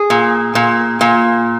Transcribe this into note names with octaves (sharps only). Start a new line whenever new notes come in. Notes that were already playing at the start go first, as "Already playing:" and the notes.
Already playing: G#4
A#2
A#2
A#2